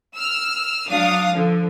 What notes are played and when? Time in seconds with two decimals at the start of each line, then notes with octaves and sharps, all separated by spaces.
0.15 E6 F6
0.88 F#3 D4 F5 D#6
1.31 D3 F3